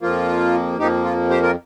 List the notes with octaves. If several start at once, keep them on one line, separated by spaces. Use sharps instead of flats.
F2 F3 A#3 F4
F2 F3 A#3 D#4 G4
F4
G4 C5
F4 A#4